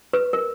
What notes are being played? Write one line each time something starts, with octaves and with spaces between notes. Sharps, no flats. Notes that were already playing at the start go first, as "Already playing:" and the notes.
B4
A#4